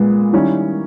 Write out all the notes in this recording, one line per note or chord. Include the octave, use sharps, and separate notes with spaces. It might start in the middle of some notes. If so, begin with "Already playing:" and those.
Already playing: A#2 G#3 B3
D#3 G3 C#4 E4